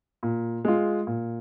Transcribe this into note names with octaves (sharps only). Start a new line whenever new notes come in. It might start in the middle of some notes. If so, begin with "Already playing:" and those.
A#2
G#3 F4
A#2